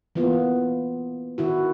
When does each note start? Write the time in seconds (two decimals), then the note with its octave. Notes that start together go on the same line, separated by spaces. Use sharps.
0.15 E3 A#3 B3 F4
1.38 D#3 E4 F#4